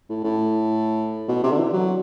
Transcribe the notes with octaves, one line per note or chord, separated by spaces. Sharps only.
A2
A2
B2
C3
D3
E3
F#3